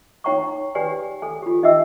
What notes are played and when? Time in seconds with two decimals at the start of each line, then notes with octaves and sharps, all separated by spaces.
0.24 D#4 C#5 G5 A#5 C#6
0.75 G4 B4 D5 G5 G#5
1.22 A4 G#5
1.42 F4 G4
1.63 D#4 D#5 E5 G5 E6